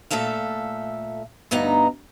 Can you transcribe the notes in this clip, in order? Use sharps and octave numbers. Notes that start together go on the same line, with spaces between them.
A#2 A3 A4 E5 F5
D2 G2 B3 D#4 A#5